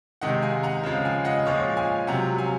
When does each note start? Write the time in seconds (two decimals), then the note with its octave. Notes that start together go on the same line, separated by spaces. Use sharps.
0.21 C3 D#3 G#3 D#5 F#5
0.42 F5 G#5
0.63 F#5 A#5
0.83 C#3 F3 G#3
1.05 F5 G#5
1.25 D#5 F#5
1.45 A#2 F3 G#3 C#5 F5
1.77 F5 G#5
2.07 C3 F#3 F#5 A#5
2.38 F5 G#5